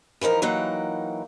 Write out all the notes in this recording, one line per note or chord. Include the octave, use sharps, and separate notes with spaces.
E3 F3 D#4 A#4
E3 F#3 A#3 D#4 F#5 G5